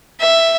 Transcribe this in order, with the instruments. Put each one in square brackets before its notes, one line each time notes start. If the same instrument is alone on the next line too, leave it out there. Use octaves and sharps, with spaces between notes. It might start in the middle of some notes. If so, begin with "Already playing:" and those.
[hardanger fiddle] E5